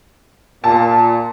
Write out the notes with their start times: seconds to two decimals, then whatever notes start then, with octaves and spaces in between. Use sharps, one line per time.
0.64 A#2 A5